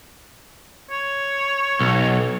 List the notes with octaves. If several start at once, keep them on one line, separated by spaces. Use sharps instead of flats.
C#5
B1